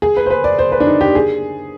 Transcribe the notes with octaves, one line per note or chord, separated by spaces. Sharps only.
G#4
B4
C5
B4
D5
C5
B4
D4
D#4
G4
G#4